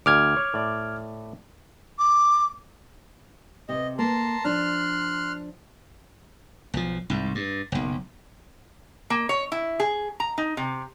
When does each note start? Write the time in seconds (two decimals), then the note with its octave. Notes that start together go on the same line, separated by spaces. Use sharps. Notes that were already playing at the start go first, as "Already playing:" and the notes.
0.06 D2 D6 F6 G#6
0.37 C#5
0.54 A2 D5
1.98 D6
3.69 C3 D#5
3.99 A#3 A5 A#5 C6
4.45 F3 D4 C6 F6 F#6
6.74 B1 F3
7.10 C2 G#2
7.35 G2
7.72 F#1 B1
9.10 A#3
9.29 C#5
9.52 E4
9.80 G#4
10.20 A#5
10.38 D#4
10.57 C3